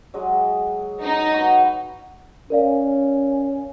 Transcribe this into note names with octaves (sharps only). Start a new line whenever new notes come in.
F#3 G#3 D#5
D#4
F#4 B4
C#4 A#4 D5 F5